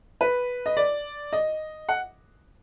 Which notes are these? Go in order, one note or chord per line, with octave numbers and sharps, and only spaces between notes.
B4
D#5
D5
D#5
F#5